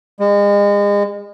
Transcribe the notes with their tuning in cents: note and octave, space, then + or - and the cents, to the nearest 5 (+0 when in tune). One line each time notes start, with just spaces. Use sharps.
G#3 -35